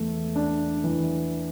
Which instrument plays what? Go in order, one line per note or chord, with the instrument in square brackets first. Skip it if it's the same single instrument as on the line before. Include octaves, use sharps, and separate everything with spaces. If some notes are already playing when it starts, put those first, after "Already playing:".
Already playing: [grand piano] E2 A3
D4
E3